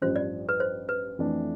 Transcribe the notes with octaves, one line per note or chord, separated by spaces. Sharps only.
A1 G2 F3 C5
D5
B4
C5
B4
F2 E3 A3 D4